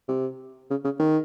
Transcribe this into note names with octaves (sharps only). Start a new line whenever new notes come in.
C3
C#3
C#3
D#3